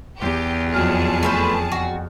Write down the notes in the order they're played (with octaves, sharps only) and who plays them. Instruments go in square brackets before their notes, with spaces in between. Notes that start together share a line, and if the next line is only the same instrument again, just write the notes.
[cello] E2 [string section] G4
[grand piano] F2 F#3 F6 [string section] G#4 A5
[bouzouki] A3 B4 C5
F#4